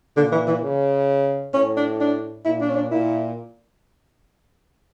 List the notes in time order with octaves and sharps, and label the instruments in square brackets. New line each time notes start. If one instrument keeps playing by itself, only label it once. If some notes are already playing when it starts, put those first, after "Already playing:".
[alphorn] A#2 [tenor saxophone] D3
[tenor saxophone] E3
E3
[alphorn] C#3
[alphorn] A2 [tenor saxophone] C#4
[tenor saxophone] D4
D4
[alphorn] A#2 [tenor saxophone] E4
[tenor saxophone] D4
C#4
D4
[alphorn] A#2 [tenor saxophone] E4